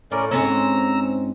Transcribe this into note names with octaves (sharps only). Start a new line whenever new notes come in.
A2 C#4 A#4 D5
G#2 C4 C#4 A#5 E6